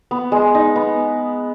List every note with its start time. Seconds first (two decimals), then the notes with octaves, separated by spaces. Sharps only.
0.11 B3
0.32 G#3
0.55 D#4
0.76 B3